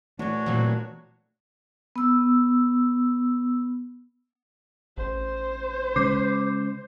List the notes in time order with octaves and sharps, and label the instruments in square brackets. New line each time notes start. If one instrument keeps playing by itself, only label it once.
[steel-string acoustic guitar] A#2 E3 [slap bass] A3 [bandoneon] D4 F#4 C#5
[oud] A#2 F#3 [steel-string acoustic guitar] E3 C4
[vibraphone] B3 E6
[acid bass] A1 [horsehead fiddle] C5
[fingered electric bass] C#3 G#3 [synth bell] D6 G6 C7